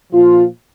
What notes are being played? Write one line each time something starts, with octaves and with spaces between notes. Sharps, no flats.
A#2 F3 F4